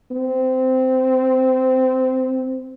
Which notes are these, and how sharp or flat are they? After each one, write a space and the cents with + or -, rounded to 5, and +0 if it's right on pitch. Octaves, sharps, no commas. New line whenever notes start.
C4 -15